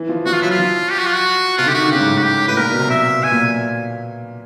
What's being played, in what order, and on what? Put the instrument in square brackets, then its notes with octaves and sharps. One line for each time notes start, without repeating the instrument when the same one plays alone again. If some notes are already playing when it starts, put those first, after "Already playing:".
Already playing: [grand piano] E3
F3
[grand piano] F3 [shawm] F#4
[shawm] F4
[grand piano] F#3 [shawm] E4
[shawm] F4
[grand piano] F3
[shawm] G4
F#4
F4
F#4
[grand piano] C3 [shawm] F4
[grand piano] D3
[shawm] G4
[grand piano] D#3 [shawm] F#4
[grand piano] D3
[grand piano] C#3 [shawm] G4
[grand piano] G#2
A2
[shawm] F#4
G4
[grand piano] A2 [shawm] B4
[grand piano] A#2 [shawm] A#4
[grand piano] B2
C3
[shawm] E5
[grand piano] B2 [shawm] G#5
[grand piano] A#2